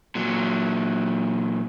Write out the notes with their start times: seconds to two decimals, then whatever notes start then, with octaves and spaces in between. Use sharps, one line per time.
0.15 A#2 F#3